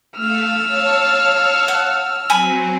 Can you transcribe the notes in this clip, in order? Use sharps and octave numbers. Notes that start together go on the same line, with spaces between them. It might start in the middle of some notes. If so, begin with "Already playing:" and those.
A3 F5 E6 F6
C#5 F5 A5
F#5
F#3 C4 G#5 B5